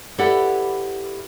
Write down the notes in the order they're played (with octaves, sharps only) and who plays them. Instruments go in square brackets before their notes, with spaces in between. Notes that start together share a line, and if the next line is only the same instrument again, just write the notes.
[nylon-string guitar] E4 G4 A4 B4 D5 F#5